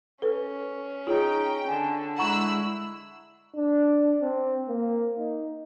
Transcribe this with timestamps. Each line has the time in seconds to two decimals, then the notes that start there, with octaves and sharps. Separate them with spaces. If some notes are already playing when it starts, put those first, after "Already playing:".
0.22 C#4 A4 B4
1.07 D#4 F4 G#4 C#5 G5
1.68 D3 G#5 A5
2.18 G#3 E4 F#5 A#5 C#6 E6 F#6
3.56 D4
4.22 C4
4.69 A#3
5.19 D#4